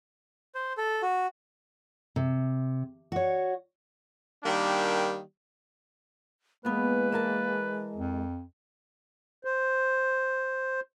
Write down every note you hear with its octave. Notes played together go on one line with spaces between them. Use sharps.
C5
A4
F#4
C3
F#4 C#5
D#3 G3 A#3 D4
E2 G#3 A#3 B3 B4
E3 A#4 A5
F2
C5